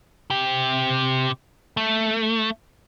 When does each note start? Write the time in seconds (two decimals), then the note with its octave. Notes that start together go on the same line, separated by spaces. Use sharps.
0.31 C3 G4
1.77 A3